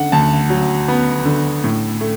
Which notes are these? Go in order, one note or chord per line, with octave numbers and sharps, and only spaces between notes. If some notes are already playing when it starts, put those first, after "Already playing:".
Already playing: D3 F#5
D2 A5
F#3
B3
D3
A2
A3